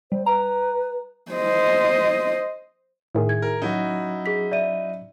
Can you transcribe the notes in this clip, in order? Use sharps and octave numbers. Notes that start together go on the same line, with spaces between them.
G3 C5
B4 A#5
C5 D#5
A2 D#3 E4 G#4
G#6
A#4
F#3 C#4 D#4 E4 F#4
G#4 B6
D5 E5 D#7